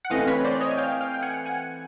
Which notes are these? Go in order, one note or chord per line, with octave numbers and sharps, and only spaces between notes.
F#5
E3 A3 C4 E4 D#5 F5
B4 C#5
C5 D5
C#5 D#5
G#5
F5 G5
F5 G5
G5
F#5 G#5
F#5 G#5